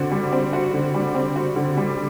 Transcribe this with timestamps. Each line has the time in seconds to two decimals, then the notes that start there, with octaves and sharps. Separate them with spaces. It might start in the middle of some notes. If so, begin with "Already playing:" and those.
Already playing: D3 C4 F#4
0.11 G3
0.32 C4
0.53 F#4
0.74 D3
0.94 G3
1.15 C4
1.36 F#4
1.56 D3
1.77 G3